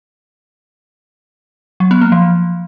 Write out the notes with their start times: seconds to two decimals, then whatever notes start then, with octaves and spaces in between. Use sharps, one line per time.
1.80 F#3
1.91 B3
2.01 A#3
2.12 F3